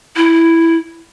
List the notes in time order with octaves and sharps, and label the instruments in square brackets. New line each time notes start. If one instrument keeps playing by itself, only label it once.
[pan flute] E4